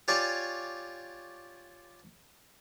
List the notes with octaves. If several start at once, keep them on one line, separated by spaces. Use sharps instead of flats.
F4 G4 C#5 D5 G#5 C#6